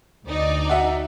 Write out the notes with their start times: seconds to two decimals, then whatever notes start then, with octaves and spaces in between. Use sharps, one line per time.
0.25 D2 D#4 D5
0.69 F#4 E5 F#5